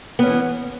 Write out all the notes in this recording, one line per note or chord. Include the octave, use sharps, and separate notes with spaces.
E3 B3 C#4